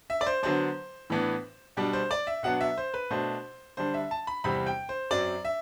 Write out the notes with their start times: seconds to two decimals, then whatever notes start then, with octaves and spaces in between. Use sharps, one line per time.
0.10 E5
0.21 D5
0.26 C5
0.43 D3 F#3 B3 D4 C5
1.10 A2 E3 B3 D4
1.77 B2 G3 D4
1.93 C5
2.11 D5
2.27 E5
2.43 B2 F#3 B3 D4 F#5
2.60 E5
2.78 C5
2.94 B4
3.10 B2 A3 D4 C5
3.77 D3 G3 D4 C5
3.94 E5
4.11 A5
4.27 B5
4.44 E2 C3 G3 C4 B5
4.66 G5
4.89 C5
5.11 F#2 F#3 C4 D5
5.45 E5